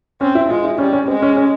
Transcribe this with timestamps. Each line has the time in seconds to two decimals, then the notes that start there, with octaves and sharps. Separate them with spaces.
0.21 C4 C#4
0.35 E4
0.50 G#3 F4
0.65 E4
0.78 G3 C#4
0.93 C#4
1.08 G#3 C4
1.22 C#4
1.36 C#4